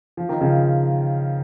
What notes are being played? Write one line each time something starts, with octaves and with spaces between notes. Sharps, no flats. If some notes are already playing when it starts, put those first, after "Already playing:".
F3
D#3
C#3 F3